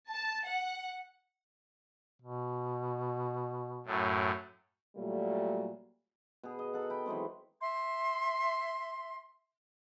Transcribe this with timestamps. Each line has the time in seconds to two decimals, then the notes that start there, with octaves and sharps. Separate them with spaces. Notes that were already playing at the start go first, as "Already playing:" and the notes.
0.10 A5
0.46 F#5
2.22 B2
3.86 F#2 A2
4.96 A#2 F#3 G3 A3
6.43 B2 G#4
6.59 D#5
6.74 D#4 A4 F#5
6.90 G5 B5
7.06 E3 F#3 G#3 C4
7.61 E5 C6